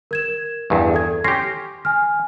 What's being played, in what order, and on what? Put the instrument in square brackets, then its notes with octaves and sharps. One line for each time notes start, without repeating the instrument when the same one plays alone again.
[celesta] A#4 G#6 E7
[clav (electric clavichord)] E2 G2
[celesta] A4 G#6
[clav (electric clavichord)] C#4 G4 [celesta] C6 A#6 C7
[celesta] G#5 F6